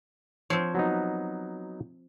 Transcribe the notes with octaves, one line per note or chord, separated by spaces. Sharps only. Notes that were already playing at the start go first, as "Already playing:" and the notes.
F3 C4 C#5
F#3 B3 D#4